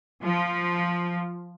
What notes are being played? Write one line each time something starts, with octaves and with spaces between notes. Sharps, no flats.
F3